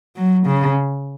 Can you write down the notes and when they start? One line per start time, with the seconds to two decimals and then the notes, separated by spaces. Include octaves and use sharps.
0.16 F#3
0.46 C#3